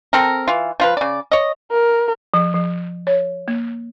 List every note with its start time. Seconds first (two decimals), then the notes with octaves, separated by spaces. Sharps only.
0.13 C4 A4 A#4
0.48 E3 F4
0.80 F3 F4 B4
0.97 C#3 D5
1.32 C#5 D#5
1.72 A#4
2.34 F3
2.54 F3
3.07 C#5
3.48 A#3